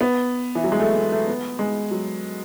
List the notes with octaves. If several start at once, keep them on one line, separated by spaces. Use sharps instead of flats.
B3
E3
F#3
G#3
A3
A3
A3
B3
G#3
F#3